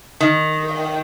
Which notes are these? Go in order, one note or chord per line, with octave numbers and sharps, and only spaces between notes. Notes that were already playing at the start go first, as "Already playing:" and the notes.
D#3